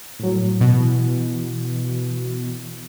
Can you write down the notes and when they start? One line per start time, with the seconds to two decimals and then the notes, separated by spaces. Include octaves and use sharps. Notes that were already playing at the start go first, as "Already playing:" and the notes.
0.20 A2 F#3
0.61 B2
0.74 E3